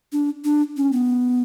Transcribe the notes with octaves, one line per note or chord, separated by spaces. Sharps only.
D4
D4
C#4
B3